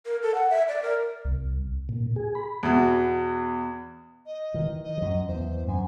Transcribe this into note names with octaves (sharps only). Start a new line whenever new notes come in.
A#4
A4
F#5
E5
D5
A#4
C2
A#2
G#4
B5
E2 B2
D#5
D#3 E3
D#5
F#2 F3
E2 E3 C5
F#2 G#5